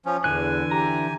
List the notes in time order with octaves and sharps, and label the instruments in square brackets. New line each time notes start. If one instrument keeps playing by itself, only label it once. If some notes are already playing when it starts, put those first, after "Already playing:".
[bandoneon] F3 C#4
[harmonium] E2 [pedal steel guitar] D3 E3 F#6 [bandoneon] G#5
[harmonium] G4 [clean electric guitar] A#5